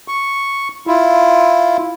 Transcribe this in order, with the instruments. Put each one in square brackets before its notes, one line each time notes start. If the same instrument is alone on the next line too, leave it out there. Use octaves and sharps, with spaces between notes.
[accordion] C#6
E4 F4